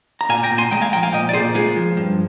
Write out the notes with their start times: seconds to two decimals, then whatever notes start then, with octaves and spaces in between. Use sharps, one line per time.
0.21 A#5
0.29 A#2 F5 G#5
0.43 G5 A#5
0.51 A#2
0.58 G#5 C6
0.71 G#3 G5 A#5
0.82 F5 G#5
0.93 F3 G5 A#5
1.03 F5 G#5
1.13 A#2 D#5 G5
1.29 D5
1.33 A#2 G#4 C5
1.55 G#3 F4 G#4
1.76 F3
1.97 G2